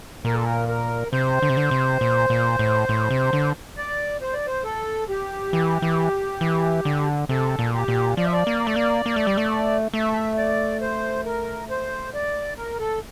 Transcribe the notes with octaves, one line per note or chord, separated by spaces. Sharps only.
A#2 A#4
A4
A#4
A#4
C3 C5
D3
C3
D3
C3
A#2
A#2
A2
A2
C3
D3
D5
C5
D5
C5
A4
G4
E3
E3
E3
D3
C3 A4
A#2
G4
A#2
F3 D5
E5
D5
A#3
A3
A#3
A#3
A3
G3
A3
A3 E5
D5
C5
A#4
C5
D5
A#4
A4